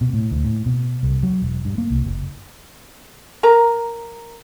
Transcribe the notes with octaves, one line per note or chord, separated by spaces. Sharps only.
B2
A2
D2
A2
B2
C2
F#3
E1
G2
A#3
C2
F#1
A#4 A#5